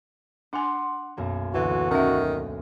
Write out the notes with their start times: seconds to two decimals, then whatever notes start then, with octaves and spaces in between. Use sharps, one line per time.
0.53 D4 F#5 G#5 C6 D6
1.17 B1 F#2 A#3
1.54 D2 E3 F#4
1.91 D#3 C#4 E5